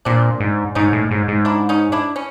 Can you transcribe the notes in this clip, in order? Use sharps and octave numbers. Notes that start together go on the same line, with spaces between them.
A#2 C4 D4
G#2
G#2 C#4 D#4
A2
G#2
G#2
D4 E4
C#4 D#4
D4 E4
C#4